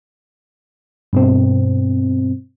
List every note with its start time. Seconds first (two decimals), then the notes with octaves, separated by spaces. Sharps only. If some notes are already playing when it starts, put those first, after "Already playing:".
1.13 G2 B2 C4